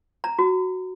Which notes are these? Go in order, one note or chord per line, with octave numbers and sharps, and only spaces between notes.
A#5
F#4